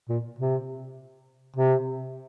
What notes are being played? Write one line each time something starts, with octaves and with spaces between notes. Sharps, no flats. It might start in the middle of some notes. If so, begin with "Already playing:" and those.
A#2
C3
C3